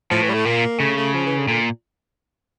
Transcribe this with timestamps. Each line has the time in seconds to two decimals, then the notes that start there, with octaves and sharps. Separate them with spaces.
0.10 A2 F3
0.22 E3
0.29 G3
0.33 A3
0.45 A#2 A#3
0.80 C#3 A3
0.97 A3
1.14 F3
1.26 E3
1.37 D3
1.48 A#2 D3